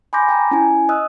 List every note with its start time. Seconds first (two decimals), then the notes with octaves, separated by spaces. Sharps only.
0.13 G#5 B5 C6 D6 G6 A#6
0.29 G5 A5 A#5
0.51 C#4 E4 G#5
0.89 D#5 D#6 E6 F#6